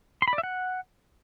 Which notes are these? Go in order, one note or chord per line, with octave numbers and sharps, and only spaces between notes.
C6
B5
D5
E5
F#5